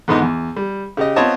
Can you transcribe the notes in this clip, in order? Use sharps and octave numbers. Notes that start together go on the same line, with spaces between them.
E2 G#2 D3 B3 D#4
E2
G3
C#3 G4 D#5
B3 C4 F4 C#5 D#5 A5